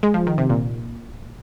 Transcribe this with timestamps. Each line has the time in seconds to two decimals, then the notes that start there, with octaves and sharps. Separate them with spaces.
0.03 G#3
0.14 F3
0.27 D#3
0.38 C3
0.49 A#2